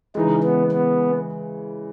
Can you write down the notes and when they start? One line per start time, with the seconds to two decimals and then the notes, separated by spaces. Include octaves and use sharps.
0.15 C#3 E3 G#3 D#4
0.43 B3
0.72 B3